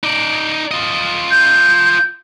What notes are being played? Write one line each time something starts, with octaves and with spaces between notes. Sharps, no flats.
D#4 D5
F4 D#5
G6